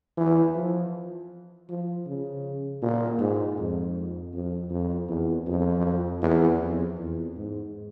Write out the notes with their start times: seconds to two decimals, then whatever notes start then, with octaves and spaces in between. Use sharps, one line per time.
0.17 E3
0.55 F3
1.69 F3
2.07 C#3
2.82 A#2
3.19 G#2
3.58 F2
4.34 F2
4.70 F2
5.08 E2
5.47 F2
6.22 E2
6.60 F2
6.98 E2
7.36 G#2